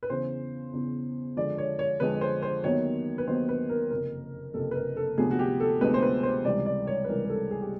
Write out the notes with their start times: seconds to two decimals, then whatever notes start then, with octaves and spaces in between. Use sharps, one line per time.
0.03 B4
0.10 E2 C#3 E3 C5
0.73 E2 C#3 E3
1.37 F2 D3 F3 G#3 D5
1.58 C#5
1.79 C#5
2.00 F2 D3 F3 G#3 B4
2.21 C5
2.42 C5
2.64 D#2 D#3 F#3 B3 C#5
3.18 B4
3.27 D#2 D#3 F#3 B3 C5
3.49 B4
3.69 A#4
3.91 F#1 F2 C3 A#4
4.54 F#1 F2 C3 A4
4.71 B4
4.76 A#4
4.96 A4
5.18 D2 C3 F3 G#3 B3 G#4
5.31 F#4
5.39 G4
5.60 A4
5.81 D2 C3 F3 G#3 B3 B4
5.94 C5
6.02 B4
6.23 C5
6.45 C#2 C3 E3 G3 D5
6.66 D5
6.87 C#5
7.04 B4
7.08 C#2 C3 E3 G3 A#4
7.25 A#4
7.29 A4
7.51 G#4
7.61 G4